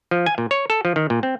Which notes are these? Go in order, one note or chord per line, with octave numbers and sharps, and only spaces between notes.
F3
G#5
A#2
C#5
A4
F3
D#3
A#2
C4